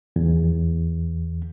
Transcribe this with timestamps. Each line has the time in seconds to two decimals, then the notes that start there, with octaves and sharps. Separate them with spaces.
0.16 E2